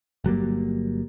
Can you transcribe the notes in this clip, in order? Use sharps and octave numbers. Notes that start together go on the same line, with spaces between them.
G1 F#3 G3 A#3